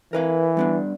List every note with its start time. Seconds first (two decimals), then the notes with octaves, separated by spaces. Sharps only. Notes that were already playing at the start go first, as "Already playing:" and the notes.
0.13 E3 A#4 B4 F5
0.57 G3 B3 D4